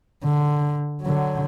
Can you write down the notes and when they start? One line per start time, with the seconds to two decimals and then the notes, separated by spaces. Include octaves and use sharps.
0.24 D3
1.02 D3 F#3